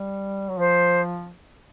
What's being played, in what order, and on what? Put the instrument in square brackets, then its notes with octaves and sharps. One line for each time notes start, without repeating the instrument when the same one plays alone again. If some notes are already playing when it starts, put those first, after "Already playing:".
Already playing: [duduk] G3
F#3
[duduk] F3 [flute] C5